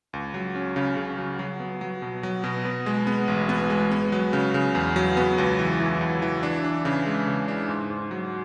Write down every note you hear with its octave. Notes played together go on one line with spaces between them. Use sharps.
C#2
F#3
C#4
C#3
C#3
F#3
F#3
B3
F#3
B2
F#3
B2
B3
G#3
B3
A1
B3
G#3
B3
F#3
C#3
C#3
E2
F#3
B3
C#2
E3
E3
C#2
E3
D4
D4
C#3
G#3
C#3
D4
G#2
G#2
F#3